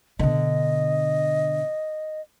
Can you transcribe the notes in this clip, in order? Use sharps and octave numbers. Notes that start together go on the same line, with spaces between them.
B2 D3 D#5